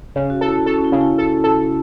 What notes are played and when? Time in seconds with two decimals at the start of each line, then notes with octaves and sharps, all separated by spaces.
0.16 C#3 C#4
0.30 F#4
0.41 E4 A4
0.66 C#4 A4
0.78 C#4
0.85 E4
0.92 C#3
1.01 E4
1.18 A4
1.44 A4